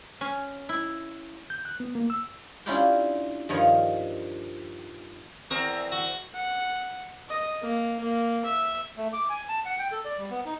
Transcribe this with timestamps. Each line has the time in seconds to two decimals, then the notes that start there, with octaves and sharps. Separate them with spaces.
0.21 C#4
0.69 E4
1.50 G6
1.65 F#6
1.80 B3
1.95 A#3
2.10 E6
2.66 C#4 D4 E4 F4 G4 G5
3.49 G2 D#3 F3 C#5
5.51 E2 C4 A#4 C#6 D#6
5.92 F#4
6.34 F#5
7.29 D#5
7.62 A#3
8.00 A#3
8.45 E5
8.97 A3
9.13 D6
9.30 G#5
9.49 A5
9.66 F#5
9.78 G5
9.92 A4
10.05 D5
10.18 G3
10.30 B3
10.45 D#4